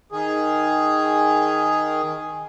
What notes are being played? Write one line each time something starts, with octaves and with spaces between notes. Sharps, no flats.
D#3 G#4